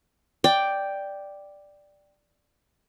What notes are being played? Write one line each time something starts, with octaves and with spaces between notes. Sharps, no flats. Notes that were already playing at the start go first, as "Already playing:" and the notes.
D5 G5